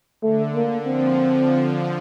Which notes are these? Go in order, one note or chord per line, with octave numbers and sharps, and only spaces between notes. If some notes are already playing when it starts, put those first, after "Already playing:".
D3 A3
A#3
F3 C4